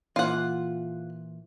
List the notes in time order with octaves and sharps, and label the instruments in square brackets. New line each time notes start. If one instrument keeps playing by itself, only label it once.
[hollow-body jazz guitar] A#2 E3 C5 [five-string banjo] F4 F#5